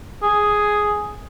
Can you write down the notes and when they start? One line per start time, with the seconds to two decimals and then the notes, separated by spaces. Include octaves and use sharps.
0.23 G#4